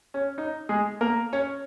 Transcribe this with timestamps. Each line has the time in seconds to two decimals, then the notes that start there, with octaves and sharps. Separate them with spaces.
0.14 C#4
0.38 D#4
0.69 G#3 G#4
1.01 A#3 A#4
1.33 C#4 C#5